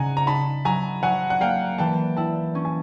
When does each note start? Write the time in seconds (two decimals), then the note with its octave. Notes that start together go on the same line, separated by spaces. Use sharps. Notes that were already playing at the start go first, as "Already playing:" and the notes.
Already playing: C#3 D#4 F#5 G#5 A#5
0.17 A#5
0.27 D#4 A5 B5
0.65 F#3 G#5 A#5
1.03 F#3 F#5 G#5
1.30 F#5
1.41 A#3 F5 G5
1.78 E3 G5 A5
2.17 E4 G5 A5
2.55 C#4
2.65 G#5